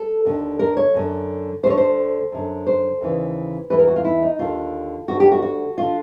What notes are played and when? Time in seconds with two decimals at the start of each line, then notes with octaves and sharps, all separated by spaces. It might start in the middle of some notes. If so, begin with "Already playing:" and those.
Already playing: A4
0.25 D#2 D3
0.59 A#4
0.77 C#5
0.94 F#2 D3
1.63 D2 C5
1.66 D3 C#5
1.77 C5
2.32 F#2 D3
2.67 C5
3.01 D#2 C#3 E3
3.70 E2 C3 E3 B4
3.79 A#4
3.87 F#4
3.96 F4
4.05 E4
4.22 D#4
4.39 D#2 D3 F4
5.08 D2 D3 F#4
5.20 G4
5.32 F#4
5.42 F#4
5.78 D3 F4